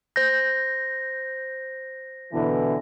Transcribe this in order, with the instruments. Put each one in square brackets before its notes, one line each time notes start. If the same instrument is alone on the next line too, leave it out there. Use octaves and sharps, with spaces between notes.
[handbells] C5 G6 [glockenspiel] A#6
[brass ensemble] B2 D3 E3